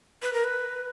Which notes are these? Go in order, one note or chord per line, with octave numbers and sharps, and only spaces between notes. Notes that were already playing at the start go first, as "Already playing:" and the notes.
B4
A#4
B4